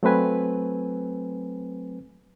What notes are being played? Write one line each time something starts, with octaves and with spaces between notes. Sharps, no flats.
F#3 A3 C4 B4 G#5